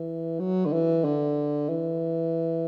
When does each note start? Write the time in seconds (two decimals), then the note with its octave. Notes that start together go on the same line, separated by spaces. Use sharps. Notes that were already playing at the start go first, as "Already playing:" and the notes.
Already playing: E3
0.40 F#3
0.66 D3
0.73 E3
1.04 D3
1.69 E3